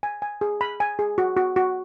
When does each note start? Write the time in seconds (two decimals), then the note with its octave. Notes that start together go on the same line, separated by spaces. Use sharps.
0.03 G#5
0.22 G#5
0.41 G#4
0.61 B5
0.80 G#5
0.99 G#4
1.18 F#4
1.37 F#4
1.56 F#4